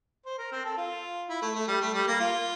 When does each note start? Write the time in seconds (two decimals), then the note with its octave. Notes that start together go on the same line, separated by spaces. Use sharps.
0.26 C5
0.38 A#4
0.52 C4
0.65 A4
0.77 F4
1.29 E4
1.42 A3
1.55 A3
1.68 G3
1.81 A3
1.94 G3
2.07 A#3
2.20 F4